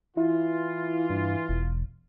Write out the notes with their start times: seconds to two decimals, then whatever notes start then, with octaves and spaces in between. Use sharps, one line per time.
0.17 E3 E4 F4
1.10 G2
1.49 E1